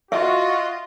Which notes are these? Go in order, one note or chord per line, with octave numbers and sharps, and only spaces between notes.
F4 F#4 D#5 E5